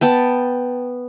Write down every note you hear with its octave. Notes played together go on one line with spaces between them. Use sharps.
B3 G5 A5